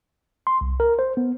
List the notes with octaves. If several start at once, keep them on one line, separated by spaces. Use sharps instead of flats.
C6
C2
A#4
C5
B3